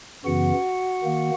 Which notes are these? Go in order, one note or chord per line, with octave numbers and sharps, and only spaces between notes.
F#2 C#3 E3 B3 F#4 F#5
D#3 A#3